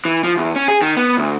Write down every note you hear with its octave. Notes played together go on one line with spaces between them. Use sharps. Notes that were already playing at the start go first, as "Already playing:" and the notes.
E3
F3
E2
C#4
G#4
D#3
B3
D2